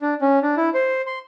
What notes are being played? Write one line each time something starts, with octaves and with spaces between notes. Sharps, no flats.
D4
C#4
D4
E4
C5
C6